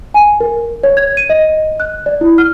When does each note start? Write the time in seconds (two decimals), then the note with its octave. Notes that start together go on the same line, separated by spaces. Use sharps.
0.14 G#5
0.40 A#4
0.83 C#5
0.97 G#6
1.17 D#7
1.30 D#5
1.80 F#6
2.06 D5
2.21 E4
2.38 F6